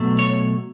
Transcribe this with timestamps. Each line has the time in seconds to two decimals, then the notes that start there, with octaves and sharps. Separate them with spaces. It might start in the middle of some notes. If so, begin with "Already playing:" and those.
Already playing: B2 F#3 A3
0.19 C#5